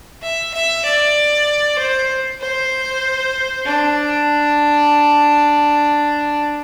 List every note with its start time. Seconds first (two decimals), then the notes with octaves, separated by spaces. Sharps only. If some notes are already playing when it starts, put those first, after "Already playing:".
0.22 E5
0.54 E5
0.85 D5
1.78 C5
2.40 C5
3.66 D4